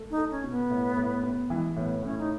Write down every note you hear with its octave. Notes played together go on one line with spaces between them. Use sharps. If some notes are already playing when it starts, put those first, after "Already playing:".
Already playing: A3
D#4
A4
C#4
B2
B3
A2
A2
B3
E3 G#3
A2 B3
A2 C#4
D#4